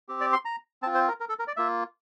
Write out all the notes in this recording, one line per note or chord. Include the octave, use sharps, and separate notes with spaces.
C4 G4
D5
C6
A#5
C4 F4 A5
C5
A#4
A#4
A4
A#4
D5
A#3 F4 E5